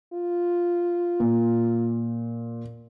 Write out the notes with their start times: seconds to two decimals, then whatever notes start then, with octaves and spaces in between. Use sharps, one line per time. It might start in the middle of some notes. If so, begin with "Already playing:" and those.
0.13 F4
1.20 A#2